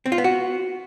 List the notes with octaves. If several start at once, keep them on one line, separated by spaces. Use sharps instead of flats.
C4
F4
B3
F#4